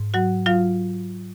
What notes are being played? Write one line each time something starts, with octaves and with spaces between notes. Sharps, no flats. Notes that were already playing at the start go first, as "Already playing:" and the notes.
Already playing: G#2
F#3 F#4 F#5
F#3 F4 F5